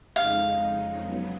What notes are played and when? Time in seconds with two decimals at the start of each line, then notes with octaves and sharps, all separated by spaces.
0.16 F2 C#3 G#3 D#4 F5
1.01 C#3 F#3 B3